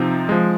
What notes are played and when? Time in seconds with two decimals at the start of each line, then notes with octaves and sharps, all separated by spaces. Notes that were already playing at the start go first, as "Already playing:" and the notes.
Already playing: C3 F3 C4 D#4
0.29 F3 G#3